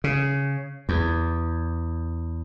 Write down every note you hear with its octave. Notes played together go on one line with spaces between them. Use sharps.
C#3
E2